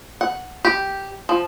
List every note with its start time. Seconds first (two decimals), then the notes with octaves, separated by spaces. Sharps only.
0.21 F#5
0.65 G4
1.29 F3